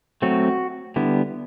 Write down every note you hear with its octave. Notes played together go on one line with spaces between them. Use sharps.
F#3 A3 C4 F#4
D3 G3 B3 E4